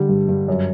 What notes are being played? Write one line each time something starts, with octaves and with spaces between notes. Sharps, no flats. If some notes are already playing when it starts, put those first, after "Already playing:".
Already playing: D3 G3
G2
G2
F#2